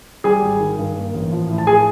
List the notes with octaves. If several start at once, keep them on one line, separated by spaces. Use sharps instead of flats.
G3 G#4 G#5
G#1
D#3
G2
A#3
A1
F3
A2
A5
G#4 G#5